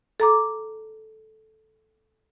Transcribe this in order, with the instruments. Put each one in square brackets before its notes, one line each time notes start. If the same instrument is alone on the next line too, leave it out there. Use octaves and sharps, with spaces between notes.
[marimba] A4 A#5 D6